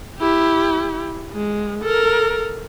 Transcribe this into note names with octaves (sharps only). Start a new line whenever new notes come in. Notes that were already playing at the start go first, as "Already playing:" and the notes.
E4 G4
G#3
A4 A#4